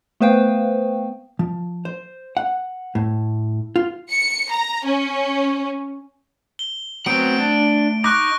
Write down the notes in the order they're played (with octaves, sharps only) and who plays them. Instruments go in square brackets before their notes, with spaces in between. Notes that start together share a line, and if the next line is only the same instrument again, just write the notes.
[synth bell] A3 B3 B4 C5 F5 G5
[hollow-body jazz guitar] F3
C5
F#5
A2
F4
[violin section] C#7
A#5
C#4
[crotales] G7
[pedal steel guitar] F#3 B3 C4 [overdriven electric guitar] A3 F#5 [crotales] D7
[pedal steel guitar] D4
[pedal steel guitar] D#4 D6 [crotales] C#6 F#6 A#6